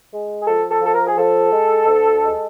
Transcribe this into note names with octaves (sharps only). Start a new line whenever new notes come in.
G#3
G#4
F3 A4
A4
F3 A4
A#4
G#4
F3 A4
G#3
D2
G#3